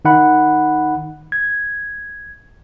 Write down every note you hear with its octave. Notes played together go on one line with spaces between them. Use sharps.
D#3 D#4 F#5 B5
G#6